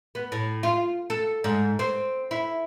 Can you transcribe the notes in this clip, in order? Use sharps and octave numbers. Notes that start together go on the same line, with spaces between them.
B3
A2
F4
A4
G#2
C4
E4